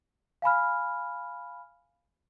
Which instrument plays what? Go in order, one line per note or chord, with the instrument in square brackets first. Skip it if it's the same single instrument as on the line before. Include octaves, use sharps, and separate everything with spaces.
[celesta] F5 G#5 B5 F6